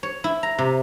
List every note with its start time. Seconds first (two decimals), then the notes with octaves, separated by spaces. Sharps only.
0.03 C#5
0.24 E4
0.43 A#5
0.58 C3